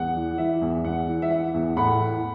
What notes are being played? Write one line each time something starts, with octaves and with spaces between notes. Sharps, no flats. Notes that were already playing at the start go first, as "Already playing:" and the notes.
Already playing: E2 F#5
E3
E3 E5
E2
E2 F#5
E3
E5
E3 F#5
E2
A2 F#5 B5
E3